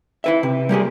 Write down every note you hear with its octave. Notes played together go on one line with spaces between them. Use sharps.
E4 B4 E5
C3
G3 A#3 G4 G#4